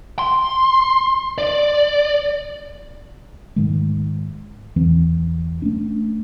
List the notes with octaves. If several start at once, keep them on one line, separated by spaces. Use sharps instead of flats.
C6
D5
G#2 D#3 G#3
E2 E3 C4
A3 C#4 D4